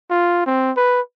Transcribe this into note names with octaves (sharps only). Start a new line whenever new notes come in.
F4
C4
B4